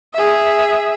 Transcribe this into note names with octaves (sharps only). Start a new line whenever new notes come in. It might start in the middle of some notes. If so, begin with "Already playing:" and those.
G#4 E5